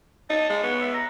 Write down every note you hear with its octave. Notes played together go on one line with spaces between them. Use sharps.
D#4 A5
G#3
B3 C#5
E5
A#5